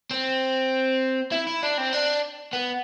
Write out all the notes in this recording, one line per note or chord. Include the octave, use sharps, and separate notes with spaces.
C4
E4
E4
D4
C4
D4
B3